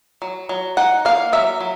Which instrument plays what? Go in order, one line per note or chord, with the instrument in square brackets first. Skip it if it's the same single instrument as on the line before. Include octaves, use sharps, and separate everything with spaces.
[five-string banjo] F#3
F#3
D#4 F#5
A#3 F5
F#3 E5
F#3